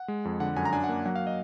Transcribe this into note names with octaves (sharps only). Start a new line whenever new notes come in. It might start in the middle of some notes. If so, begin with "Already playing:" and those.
Already playing: F#5
G#3
F2
D3 F#5
F#2 G#5
A#5
D4 G#5
F#5
A#3
F#3 F#5
F5
D#5